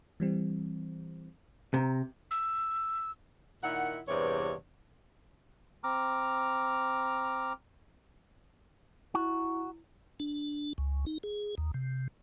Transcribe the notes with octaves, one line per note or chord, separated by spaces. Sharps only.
E3 G3 C4
C3 A#5
E6
A#2 D#3 E4 F#5
E2 G2 C3 C#5 D5
C4 A#5 D6 F6
E4 F#4
D4
C#2
D#4
G#4
D#2
C3